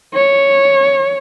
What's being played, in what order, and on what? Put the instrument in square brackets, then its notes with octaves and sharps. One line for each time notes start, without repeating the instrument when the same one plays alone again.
[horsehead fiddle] C#5